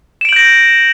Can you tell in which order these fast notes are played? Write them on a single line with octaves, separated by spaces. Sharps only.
E7 D7 F#7 G6 A#6